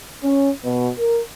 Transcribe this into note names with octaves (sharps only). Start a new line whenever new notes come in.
C#4
B2
A#4